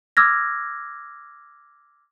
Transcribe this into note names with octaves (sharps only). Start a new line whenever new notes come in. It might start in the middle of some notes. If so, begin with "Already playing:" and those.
D6 E6 F6 G#6 A#6